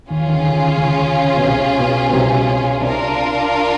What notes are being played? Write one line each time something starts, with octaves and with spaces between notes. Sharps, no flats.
D#2 D#3 C#4 F4 G#4
E3
D#3
D3
C#2 C#3
C#2 C#3
B2
C2 C3
B2
B2
C2 C3
C2 C3 D4 F4 A#4